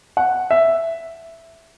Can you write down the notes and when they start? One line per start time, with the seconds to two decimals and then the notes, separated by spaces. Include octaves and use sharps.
0.17 F#5
0.51 E5